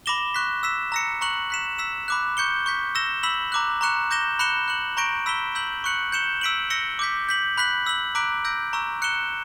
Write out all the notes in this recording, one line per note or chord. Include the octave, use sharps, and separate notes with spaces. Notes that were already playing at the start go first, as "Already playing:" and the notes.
B5 D6 A#6 E7 G7
C#6 F#6 B6
E6 B6 E7
A#5 E6 A#6 C#7
A#5 C#6 F#6 C#7 F#7
F#6 B6 E7
E6 B6 E7
B5 D6 F#6
C#6 G6 C#7 G7
C#6 G6 B6
E6 A#6 E7 G7
B5 E6 B6 F#7
A#5 D6 F#6
A#5 C#6 F#6 C#7 E7
D6 G6 A#6 E7 G7
B5 F#6 C#7 E7 G7
F#6 C#7 F#7
A#5 C#6 G6 A#6 D7
B5 E6 B6 E7 G7
E6 G6 B6 F#7
C#6 F#6 C#7 F#7
G6 C#7 E7 G7
E6 B6 D7 F#7
E6 A#6 C#7 G7
D6 G6 B6
G6 B6 F#7
B5 F#6 B6 F#7
E6 B6 F#7
A#5 D6 F#6 B6 D7
E6 G6 A#6 D7
A#5 C#6 E6
F#6 C#7 E7 G7